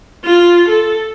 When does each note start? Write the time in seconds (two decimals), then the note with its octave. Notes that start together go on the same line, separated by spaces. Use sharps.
0.24 F4
0.69 A4